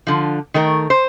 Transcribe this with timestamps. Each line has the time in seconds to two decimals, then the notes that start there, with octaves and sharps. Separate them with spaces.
0.07 D3 F3
0.54 D#3 A3 A#4
0.90 C5